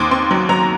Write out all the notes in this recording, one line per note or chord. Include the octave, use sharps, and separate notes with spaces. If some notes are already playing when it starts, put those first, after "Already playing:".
Already playing: D#2 C4 C6 D6 D#6
C4 C6
F#3
F#3 A#5